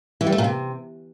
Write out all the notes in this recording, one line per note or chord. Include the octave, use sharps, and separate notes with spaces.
E3
G3
A3
A#2
C3